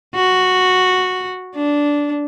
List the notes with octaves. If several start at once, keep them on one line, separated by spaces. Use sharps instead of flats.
F#4
D4